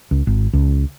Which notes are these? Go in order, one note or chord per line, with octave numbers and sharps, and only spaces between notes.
C#2
G#1
C#2